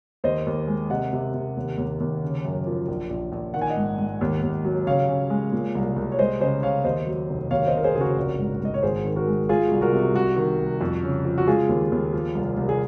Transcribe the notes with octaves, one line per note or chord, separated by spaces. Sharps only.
D#2 C5 D#5
D#2
G#3
C3 D#5 F#5
C3
C3
D#2
D#2
D#2
C#3
F#2
F3
A#1
A#1
A#1
D#3 F#5
G#5
D#5 F#5
G#2
G#2
D#2
D#2
F#3
C#3 C#5 F5
C#3
G#3
A#2
C2
C2
C#5
G#3 C5 D#5
C#3 C5 D#5
C#3 C#5 F5
D#2 C5 D#5
F#3
F1
D#2 C#5 F5
C5 D#5
F1 A#4
G#4 C5
C#3 G#4
F#4 A#4
A#1
G#2
G#2 D#5
C#5
G#1 G#4 C5
D#3
F#4 A#4
G#3
G#3 F4 G#4
F#4
C2
F#4 A#4
C3
F#4
C2 F#4
D#3
C2
F2
C#3
F3
F#4
G#3 F4 G#4
D#2
D#2
F3
C2
C2
G#4